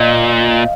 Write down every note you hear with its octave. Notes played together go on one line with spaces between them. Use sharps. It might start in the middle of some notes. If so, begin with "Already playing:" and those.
Already playing: A#2 D#5 F5